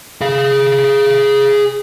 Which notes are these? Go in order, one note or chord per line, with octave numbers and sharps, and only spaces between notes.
G#4 F5